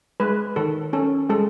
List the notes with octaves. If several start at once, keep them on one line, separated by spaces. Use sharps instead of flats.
G#3 B4
D#3 A4
C#4 A4
G#3 A4